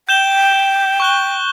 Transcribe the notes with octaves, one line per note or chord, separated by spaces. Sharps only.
G5 G6 E7 G7
C#6 F#6 G7